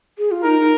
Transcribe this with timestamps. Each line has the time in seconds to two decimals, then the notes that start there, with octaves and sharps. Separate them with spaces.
0.18 G#4
0.31 F4
0.44 D#4 A#4
0.60 D#4